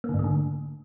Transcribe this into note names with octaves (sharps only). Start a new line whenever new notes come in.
A#3
D3
G#2
A3
D3